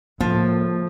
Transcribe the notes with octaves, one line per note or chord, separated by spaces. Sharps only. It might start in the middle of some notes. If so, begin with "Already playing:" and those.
C#2 A2 F3 A#3